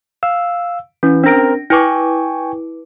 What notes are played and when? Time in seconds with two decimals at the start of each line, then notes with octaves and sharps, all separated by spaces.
0.23 F5 E6
1.03 E3 C#4
1.24 C4 D4 A#4 A#6 D7
1.70 E4 B4 G5 G#5 C#6 D6